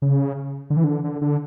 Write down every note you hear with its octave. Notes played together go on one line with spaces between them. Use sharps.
C#3
D3
E3
D3
D3
D3